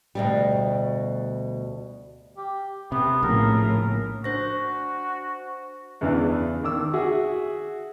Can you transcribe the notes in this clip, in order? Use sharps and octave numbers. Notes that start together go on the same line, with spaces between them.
D2 B2 G3
G4
C3 B3
A#1 A2 C#3 A#4
D4 F#4 C5 A#6
E2 C#3 E3 D4
D#3 D6 E6
F#4 G#4 E5 F#5